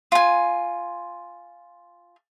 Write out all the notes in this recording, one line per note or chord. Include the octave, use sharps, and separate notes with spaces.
F4 G#5